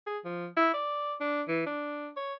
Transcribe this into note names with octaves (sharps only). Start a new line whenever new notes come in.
G#4
F3
E4
D5
D4
E3
D4
C#5